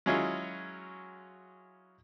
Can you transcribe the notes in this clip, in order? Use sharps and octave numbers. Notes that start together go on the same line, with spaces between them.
F#3 G#3 C#4 E4 F4 G#4